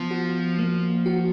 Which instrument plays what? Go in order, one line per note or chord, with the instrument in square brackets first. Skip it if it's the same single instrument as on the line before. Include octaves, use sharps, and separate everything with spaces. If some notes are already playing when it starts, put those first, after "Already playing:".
Already playing: [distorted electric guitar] F3 [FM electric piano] B3
[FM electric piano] F#4
A#3
F#4